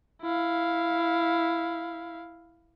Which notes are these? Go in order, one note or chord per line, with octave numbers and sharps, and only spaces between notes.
E4 F5